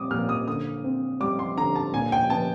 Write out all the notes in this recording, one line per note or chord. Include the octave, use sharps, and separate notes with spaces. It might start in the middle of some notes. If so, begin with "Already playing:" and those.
Already playing: A#2 G3 C4 D6 D#6
A#2 F6
D#6
D3 D#6
C4
G3 D6
C6
D3 A#5
A5
A#2 G#5
G5
B3 A5